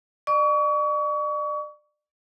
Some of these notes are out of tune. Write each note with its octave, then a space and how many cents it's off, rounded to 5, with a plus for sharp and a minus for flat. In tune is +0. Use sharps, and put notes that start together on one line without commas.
D5 +40 C#6 +35